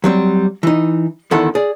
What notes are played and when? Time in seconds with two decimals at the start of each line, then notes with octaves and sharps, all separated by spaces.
0.04 F#3 G3 C4
0.63 E3 D#4
1.31 E2 D3 D#3 E4 A4 F#5
1.55 G#4 D5